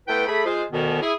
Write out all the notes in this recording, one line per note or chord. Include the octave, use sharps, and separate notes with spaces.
A3 B3 E4 B4 C5 G5
A3 G#4 B5
G#3 F4 G#4 C5
D2 B2 D#3 B3
E4 G#4